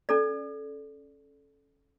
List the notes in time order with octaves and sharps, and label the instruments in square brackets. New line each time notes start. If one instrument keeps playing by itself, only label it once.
[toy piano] C#4 A4 D5